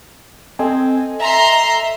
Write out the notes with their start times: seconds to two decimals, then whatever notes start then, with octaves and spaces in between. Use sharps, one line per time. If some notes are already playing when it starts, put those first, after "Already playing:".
0.59 C4 A4 D#5 G#5
1.20 E5 A#5 C6